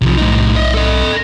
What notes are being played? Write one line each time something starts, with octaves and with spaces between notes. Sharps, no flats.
B1 C3 F3
A2 D#4
D#5 E5
A4 D#5